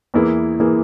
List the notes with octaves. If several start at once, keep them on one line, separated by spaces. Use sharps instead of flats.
E2 E3 A#3 E4 G#4
E3 A#3 E4 G#4